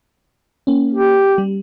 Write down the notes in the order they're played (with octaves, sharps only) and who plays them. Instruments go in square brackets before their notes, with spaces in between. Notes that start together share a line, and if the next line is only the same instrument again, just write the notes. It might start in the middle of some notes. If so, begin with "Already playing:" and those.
[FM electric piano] A#3 C#4
[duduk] G4
[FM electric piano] G3